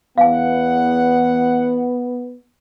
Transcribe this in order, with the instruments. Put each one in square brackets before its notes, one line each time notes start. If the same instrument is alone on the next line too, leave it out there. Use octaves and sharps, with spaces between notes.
[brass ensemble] E2 F#5 [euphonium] B3 [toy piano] F5 G#5